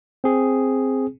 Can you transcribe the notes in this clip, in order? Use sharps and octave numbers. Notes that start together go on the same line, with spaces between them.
C4 G#4